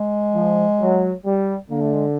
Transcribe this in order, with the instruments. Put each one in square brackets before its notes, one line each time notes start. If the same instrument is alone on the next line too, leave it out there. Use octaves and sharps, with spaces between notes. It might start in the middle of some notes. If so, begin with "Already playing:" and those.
Already playing: [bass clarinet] G#3
[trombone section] F3
F#3
G3
[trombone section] D3 [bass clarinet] A#3
[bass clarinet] A3
G#3